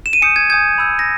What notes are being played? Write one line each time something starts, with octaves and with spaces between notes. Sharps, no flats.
E7
D#7
G#5 D#6 G6 C#7
G#6
G#5 D#6 G6 G#6
B5 E6 G6
A#6